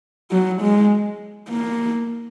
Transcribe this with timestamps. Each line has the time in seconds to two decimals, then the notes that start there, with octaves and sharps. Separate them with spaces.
0.31 F#3
0.61 G#3
1.49 A#3